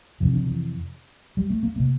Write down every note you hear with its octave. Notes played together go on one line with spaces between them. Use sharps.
F2 C3 E3
D3
E3
G3
A3
A#3
C3 A#3